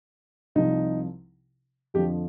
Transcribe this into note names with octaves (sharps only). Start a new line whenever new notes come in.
C2 C3 F3 D#4
F2 D3 F3 G4